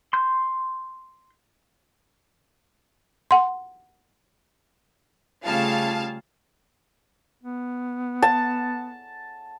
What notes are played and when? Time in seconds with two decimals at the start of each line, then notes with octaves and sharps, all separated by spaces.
0.13 C6 G6
3.31 F#5 C6
5.44 C#3 G3 A3 F4 G#4 F5 A5
7.44 B3
8.22 A5